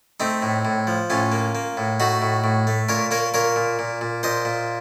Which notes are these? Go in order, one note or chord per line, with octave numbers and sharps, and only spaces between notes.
A3 C4 D#4
A2
A2
F3
A2 C#4 F4
A#3
A#3
A2
A3 D#4 F#4
A2
A2
A3
A#2 A#4 C#5
A#3 A#4 C#5
A#2 A#4 C#5
A#2
A#2
A#2
A#2 C5 D#5
A#2